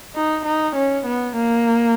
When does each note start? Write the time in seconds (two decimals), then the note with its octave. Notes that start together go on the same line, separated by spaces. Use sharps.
0.16 D#4
0.45 D#4
0.76 C#4
1.06 B3
1.36 A#3